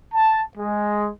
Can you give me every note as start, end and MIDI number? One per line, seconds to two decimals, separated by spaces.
0.14 0.41 81
0.56 1.09 56